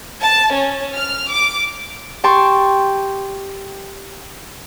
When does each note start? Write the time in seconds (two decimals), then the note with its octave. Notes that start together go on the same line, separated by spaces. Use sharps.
0.19 A5
0.52 C#4
0.95 F6
1.31 D6
2.24 G4 G5 A5 C6 C#6